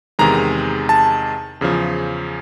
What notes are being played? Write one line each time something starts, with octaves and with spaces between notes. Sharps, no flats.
E2 C3 D#3 G#3 A#5
A5
E2 C#3 F3